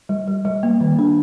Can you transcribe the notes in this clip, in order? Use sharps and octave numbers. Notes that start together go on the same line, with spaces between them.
G3
G3
G3
A#3
D#3
D4